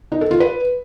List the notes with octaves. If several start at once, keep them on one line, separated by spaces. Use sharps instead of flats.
D#4
A4
F4
B4